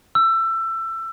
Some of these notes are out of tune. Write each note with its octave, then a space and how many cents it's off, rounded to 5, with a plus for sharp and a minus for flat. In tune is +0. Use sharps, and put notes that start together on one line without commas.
E6 +25